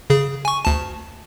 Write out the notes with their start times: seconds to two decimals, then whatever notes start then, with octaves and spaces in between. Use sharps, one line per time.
0.10 C#3 G#4
0.45 G#5 C#6
0.65 D2 A5